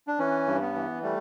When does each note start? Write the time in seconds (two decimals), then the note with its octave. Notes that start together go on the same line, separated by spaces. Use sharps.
0.07 D4
0.19 E3 C#4
0.47 G2
0.61 B3
0.75 E3
1.02 G3 A3